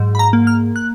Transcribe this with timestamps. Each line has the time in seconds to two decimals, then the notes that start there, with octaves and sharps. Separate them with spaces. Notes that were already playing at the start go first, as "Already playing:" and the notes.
Already playing: G#2 F#3
0.15 B5
0.19 A#5
0.33 A#3
0.47 F6
0.76 F#6